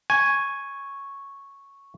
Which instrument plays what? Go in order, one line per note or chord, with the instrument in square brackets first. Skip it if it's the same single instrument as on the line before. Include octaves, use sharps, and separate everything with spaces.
[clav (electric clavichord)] G#5 [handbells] C#6